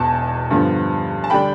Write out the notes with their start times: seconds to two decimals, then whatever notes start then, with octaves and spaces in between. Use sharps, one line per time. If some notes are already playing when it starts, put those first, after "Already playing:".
Already playing: E1 E2 B2 A5
0.51 G2 D3 F3 B3
1.24 A5
1.30 D3 G3 D4 G5 B5